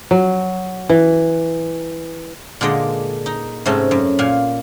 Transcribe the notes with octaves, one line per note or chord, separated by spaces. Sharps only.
F#3
E3
A#2 D3 G#3 D5 D#5
D#4
G#2 C3 A3 C#4 A5
F#2
A#2 F5 G#5